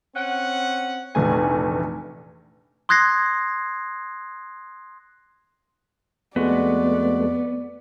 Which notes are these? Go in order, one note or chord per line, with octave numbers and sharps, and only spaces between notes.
C4 C#4 F#5
F1 A#1 E3 A3 G#5
C6 D#6 F#6 G#6 A#6 C7
F2 G#3 A3 B3 F#4 D5